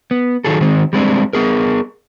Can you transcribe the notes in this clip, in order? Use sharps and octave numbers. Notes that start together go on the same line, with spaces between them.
B3
D#3 F#3 G#4 A4
D#3 G#3 C4
G3 G#3 C4 D4
B3 G#4 A#4